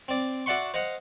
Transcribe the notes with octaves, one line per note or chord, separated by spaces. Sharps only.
C4 D5
F#4 D5 E5 F#5 C6 C#6
C5 D#5 F5 F#5